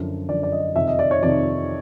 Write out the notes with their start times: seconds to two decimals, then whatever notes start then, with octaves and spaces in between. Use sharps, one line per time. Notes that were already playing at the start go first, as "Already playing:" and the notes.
Already playing: F#2 D3 F3
0.29 F#2 D3 F3 D5
0.43 D5
0.52 D#5
0.76 F2 C3 D#3 E5
0.87 D#5
0.99 D5
1.11 C#5
1.22 F2 C3 D#3 D5